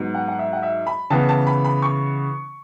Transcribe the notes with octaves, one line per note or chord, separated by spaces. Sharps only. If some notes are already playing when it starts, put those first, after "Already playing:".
Already playing: G#2 F#3 B3
F#5
F#5
E5
F#5
E5
B5
C#3 E3 B3 A5
A5
B5
B5
C#6